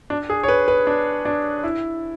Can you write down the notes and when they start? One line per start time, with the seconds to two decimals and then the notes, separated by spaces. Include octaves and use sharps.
0.10 D4
0.30 G#4
0.43 C#5
0.48 B4
0.68 B4
0.87 D4
1.25 D4
1.63 E4